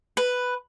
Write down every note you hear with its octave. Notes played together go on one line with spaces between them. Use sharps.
B4